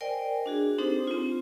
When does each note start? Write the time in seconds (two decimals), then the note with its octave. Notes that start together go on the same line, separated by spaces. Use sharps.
0.01 A#4 C5 D5 D#5 G5 G#5
0.46 D4 F#4 G#4
0.78 C4 D4 D#4 G4 A4 C5
1.07 C4 F4